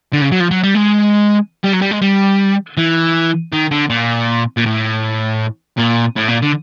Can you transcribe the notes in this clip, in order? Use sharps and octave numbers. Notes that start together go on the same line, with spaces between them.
D3
C#3
F#3
F3
F#3
G3
G#3
G3
F#3
G3
G#3
G3
E3
D#3
D3
A#2
A#2
A2
A#2
A2
A#2
D3